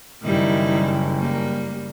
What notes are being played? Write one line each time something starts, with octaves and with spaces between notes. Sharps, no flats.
F#1 D#3 G3 E4
G3 A#3